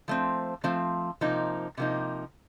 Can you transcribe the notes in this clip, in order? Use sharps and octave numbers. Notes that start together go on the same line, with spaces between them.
F3 A3 C4
F3 A3 C4
C3 F3 A#3 D#4
C3 F3 A#3 D#4